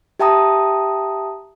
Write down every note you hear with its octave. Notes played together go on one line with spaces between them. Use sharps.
G4 E5 G5 A5 A#5 D#6